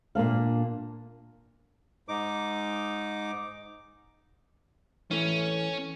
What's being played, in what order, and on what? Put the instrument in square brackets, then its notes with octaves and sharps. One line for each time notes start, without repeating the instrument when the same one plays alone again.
[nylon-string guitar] A#2 A#3 D4 F5
[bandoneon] G#2 D#4 D6
[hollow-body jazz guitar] E3 A3 [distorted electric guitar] C#4